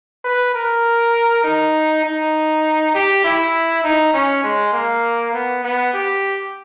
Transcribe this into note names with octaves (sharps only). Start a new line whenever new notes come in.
B4
A#4
D#4
D#4
G4
E4
D#4
C#4
G#3
A#3
B3
B3
G4